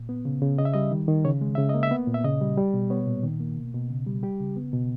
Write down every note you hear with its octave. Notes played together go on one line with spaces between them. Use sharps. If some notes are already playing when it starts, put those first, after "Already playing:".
Already playing: A#2
B3
C#3
C#3
C#3 D#5
E5
G3 D#5
D#3
D#3
C#3 C#5
G#3
C#3 E5
A#3 D#5
E5
B3
A#2
E5
C#3 D#5
G3
G3
B2
B3 C#5
A#2
D#3
A#3
B2
B2
C#3
G3
G3 G4
C#3
B3
B2